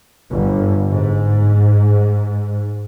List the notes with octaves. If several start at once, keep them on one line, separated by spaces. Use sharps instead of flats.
G1
G#2